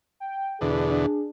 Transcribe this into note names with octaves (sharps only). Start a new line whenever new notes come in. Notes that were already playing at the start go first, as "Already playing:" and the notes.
G5
E2 B2 D3 D4 G#4